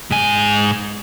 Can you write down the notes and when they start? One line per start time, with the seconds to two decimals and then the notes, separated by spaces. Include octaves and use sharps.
0.11 G#2 G#5